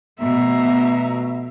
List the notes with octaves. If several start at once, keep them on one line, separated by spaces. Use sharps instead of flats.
B2 F3 A3 E5 A#5